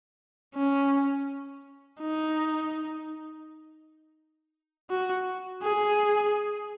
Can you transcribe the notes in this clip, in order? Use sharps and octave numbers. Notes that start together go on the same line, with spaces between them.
C#4
D#4
F#4
G#4